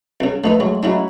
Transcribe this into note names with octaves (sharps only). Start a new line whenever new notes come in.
C2 C#3
F3 A3 D#4 B4
F#3 G#3
C#3 F#3 G#3 D#4 E4 F#4